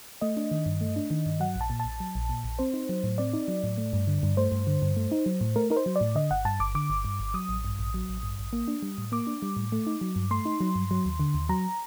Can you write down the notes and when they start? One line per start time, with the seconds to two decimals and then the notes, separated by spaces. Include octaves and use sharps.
0.21 A3 D#5
0.37 D4
0.51 D#3
0.66 G2
0.81 A3
0.96 D4
1.11 D#3
1.26 G2
1.40 F#3 F#5
1.56 A#1
1.61 A5
1.70 A#2
1.80 A5
1.85 A#1
2.00 F#3
2.15 A#1
2.29 A#2
2.44 A#1
2.59 C4 C5
2.74 D#4
2.89 F#3
3.04 A2
3.18 C4 D5
3.33 D#4
3.48 F#3
3.63 A2
3.78 A3
3.93 G2
4.07 D3
4.23 G2
4.37 A3 C5
4.52 G2
4.67 D3
4.82 G2
4.97 A3
5.12 D#4
5.26 F#3
5.41 A2
5.56 A3 A#4
5.70 D#4 A#4
5.76 C5
5.86 F#3
5.96 D5
6.01 A2
6.15 D3 D#5
6.31 G1 F#5
6.45 G2 A5
6.60 G1 D6
6.75 D3 D6
6.90 G1
7.05 G2
7.20 G1
7.34 F#3 D#6
7.49 A1
7.64 G2
7.79 A1
7.94 F#3
8.09 A1
8.23 G2
8.39 A1
8.53 A#3
8.68 D4
8.83 G3
8.98 A2
9.12 A#3 D6
9.27 D4
9.42 G3
9.56 A2
9.72 A3
9.87 D#4
10.01 F#3
10.16 G2
10.31 A3 C6
10.45 D#4
10.61 F#3
10.76 G2
10.91 F#3
11.06 D#2
11.20 D3
11.34 D#2
11.49 F#3 A#5